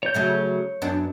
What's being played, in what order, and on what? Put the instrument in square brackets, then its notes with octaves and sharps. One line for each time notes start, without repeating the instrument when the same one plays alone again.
[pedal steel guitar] C#5 G6
[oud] C#3 F#3 A3
F#2 B3 D4